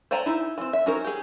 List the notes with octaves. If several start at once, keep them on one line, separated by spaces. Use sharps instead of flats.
C5 D5 G5 G#5 A#5
D#4 E4
E3 C4
E5
C#4 D#4 F#4 A#4 C5
G4 G#4